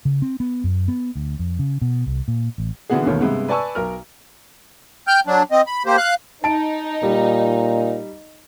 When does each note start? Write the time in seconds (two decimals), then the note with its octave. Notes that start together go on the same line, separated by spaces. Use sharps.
0.05 C#3
0.22 C4
0.40 B3
0.64 F#2
0.88 B3
1.16 D2
1.39 F2
1.59 C#3
1.82 B2
2.06 C2
2.28 A#2
2.58 A1
2.90 A#2 D3 E3 B3 F#4 G#4
3.05 A1 D#2 B2 D#3 A4 C#5
3.20 G2 C3 G#3 B3
3.48 B4 D5 G#5 A5 C#6 E6
3.75 B1 A#4 F6
5.07 G5 F6 G6
5.27 F#3 D4
5.51 C4 D#5
5.67 B5
5.86 A#3 G4 C5
5.97 F5 F#6
6.44 D#4 A5 D7
7.03 A#2 G3